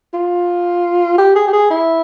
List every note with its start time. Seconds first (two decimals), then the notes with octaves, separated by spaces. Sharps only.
0.14 F4
1.18 G4
1.36 G#4
1.47 G4
1.53 G#4
1.70 E4